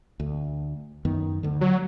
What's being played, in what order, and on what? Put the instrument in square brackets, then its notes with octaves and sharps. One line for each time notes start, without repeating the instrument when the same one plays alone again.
[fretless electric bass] D2
F#2 D#3 B3
D2 D3
[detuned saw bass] F#3